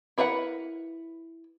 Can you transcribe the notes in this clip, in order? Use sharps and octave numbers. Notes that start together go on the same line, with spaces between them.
E4 A#4 B4 F5 F#5